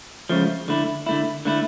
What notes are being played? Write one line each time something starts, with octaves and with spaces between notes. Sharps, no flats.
C#2 C#3 F3 A3
D3 A3 E4
D3 A3 E4
D3 A3 E4